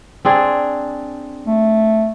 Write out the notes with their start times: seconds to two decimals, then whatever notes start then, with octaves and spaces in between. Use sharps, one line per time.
0.25 C4 D4 G#4
1.47 A3